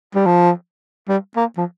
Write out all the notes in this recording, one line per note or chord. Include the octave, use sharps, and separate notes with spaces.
G3
F3
G3
A#3
F3